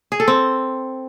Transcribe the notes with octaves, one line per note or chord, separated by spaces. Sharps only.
G#4
A4
C4